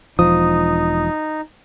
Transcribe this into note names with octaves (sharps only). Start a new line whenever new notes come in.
E1 F3 D#4 D#6